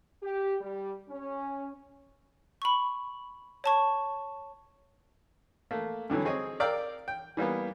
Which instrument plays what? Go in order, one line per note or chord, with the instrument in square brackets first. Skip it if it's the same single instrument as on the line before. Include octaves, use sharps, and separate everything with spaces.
[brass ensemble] G4
G3
C#4
[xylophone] B5 C#6
C#5 A5 C#6
[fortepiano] A3 A#3
G2 D3 E3 F#3
C4 G#4 C#5 D#5 G#5
A#4 D5 F5 G5 D6 E6
G5
E3 G3 A#3 B3